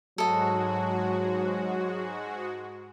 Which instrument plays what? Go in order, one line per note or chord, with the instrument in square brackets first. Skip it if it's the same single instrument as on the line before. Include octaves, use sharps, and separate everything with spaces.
[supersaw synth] G#2 G#3 F#4 [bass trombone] F#3 [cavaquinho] A4 D#5